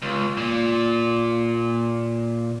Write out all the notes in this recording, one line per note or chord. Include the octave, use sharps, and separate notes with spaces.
C#2
A#2